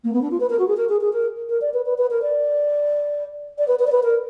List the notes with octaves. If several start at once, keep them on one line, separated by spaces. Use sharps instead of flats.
A#3
B3
D4
F4
B4
A#4
F#4
G#4
A#4
G#4
G#4
A#4
A#4
D5
B4
B4
B4
A#4
D5
D5
B4
B4
D5
B4
A#4